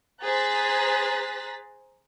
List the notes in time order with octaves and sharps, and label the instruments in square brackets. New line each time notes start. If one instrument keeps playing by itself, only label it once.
[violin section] G#4 C5 A#5 F#6 A6 B6